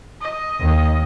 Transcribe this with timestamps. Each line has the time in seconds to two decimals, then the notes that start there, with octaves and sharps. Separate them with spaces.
0.21 D#5
0.59 D#2